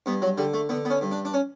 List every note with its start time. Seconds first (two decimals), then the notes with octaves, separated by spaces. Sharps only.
0.06 G2 B3
0.22 F#3
0.38 D3 G3
0.54 A3
0.69 D3 B3
0.85 B3
0.90 C#4
1.01 G2
1.11 D4
1.25 D4
1.34 C#4